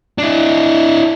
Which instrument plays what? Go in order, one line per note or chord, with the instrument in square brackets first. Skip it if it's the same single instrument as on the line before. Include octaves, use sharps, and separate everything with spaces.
[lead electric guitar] D4 E4